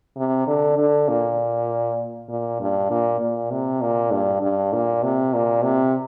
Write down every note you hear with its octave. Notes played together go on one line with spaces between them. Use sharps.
C3
D3
D3
A#2
A#2
G2
A#2
A#2
C3
A#2
G2
G2
A#2
C3
A#2
C3